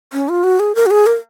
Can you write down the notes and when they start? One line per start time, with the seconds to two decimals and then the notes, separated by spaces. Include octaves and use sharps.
0.13 C#4
0.29 F4
0.44 F#4
0.59 G#4
0.75 A#4
0.86 F#4
0.91 G#4
1.06 A#4